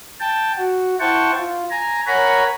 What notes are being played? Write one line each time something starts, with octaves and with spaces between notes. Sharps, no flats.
G5 A5
F#4
E4 C5 F#5 G5 A5 C#6
F4
G#5 A#5
A#4 C#5 F#5 G#5 A#5 B5